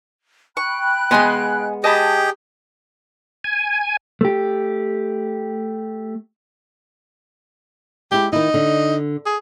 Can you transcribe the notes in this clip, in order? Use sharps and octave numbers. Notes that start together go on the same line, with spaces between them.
G5 B5 C#6 F#6
G#3 B3 D#5 G#5 C6
G4 G#4 D#5 G5 A5 B5
G#5
A3 G4
G#3 E4 G4
D#3 D#4 E4
D3
G#4